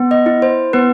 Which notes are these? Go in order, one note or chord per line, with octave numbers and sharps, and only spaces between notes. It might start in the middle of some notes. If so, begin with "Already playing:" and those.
Already playing: B3
D#5
E4
C5
B3 B4